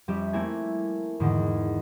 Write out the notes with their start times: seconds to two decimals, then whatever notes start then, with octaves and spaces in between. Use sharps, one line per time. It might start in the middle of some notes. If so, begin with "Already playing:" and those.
0.08 F2 G3 C#4 G4 E5
0.33 A3 A#3 C4 E4 G#5
1.20 E2 G#2 D3 D#3